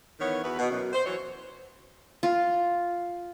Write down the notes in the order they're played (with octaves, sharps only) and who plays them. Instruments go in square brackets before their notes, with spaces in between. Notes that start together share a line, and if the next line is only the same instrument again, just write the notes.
[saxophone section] D#3 E3 B3 C#5
E2 F#4 B4
B2
F#2 B2
C5
E3 F#3 C#5
[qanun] F4